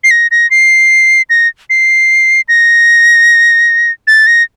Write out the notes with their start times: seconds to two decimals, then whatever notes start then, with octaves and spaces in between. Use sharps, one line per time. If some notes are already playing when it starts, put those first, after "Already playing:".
0.04 C7
0.11 A#6
0.31 A#6
0.51 C7
1.30 A#6
1.70 C7
2.49 A#6
4.07 A6
4.27 A#6